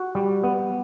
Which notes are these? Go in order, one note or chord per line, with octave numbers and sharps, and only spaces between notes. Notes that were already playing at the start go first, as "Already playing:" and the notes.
Already playing: F#4
G3
B3